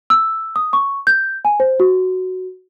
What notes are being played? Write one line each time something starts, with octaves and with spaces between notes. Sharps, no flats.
E6
D#6
C#6
G6
G#5
C5
F#4